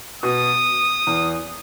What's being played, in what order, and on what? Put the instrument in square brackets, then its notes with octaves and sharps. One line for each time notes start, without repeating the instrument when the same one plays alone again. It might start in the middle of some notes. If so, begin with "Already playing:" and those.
[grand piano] B2 [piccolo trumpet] D#6
[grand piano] E2